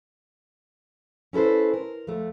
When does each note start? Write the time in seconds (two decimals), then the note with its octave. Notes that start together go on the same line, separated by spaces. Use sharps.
1.33 C#4 E4 A4 B4 C5
1.74 A#4
2.07 F2 A3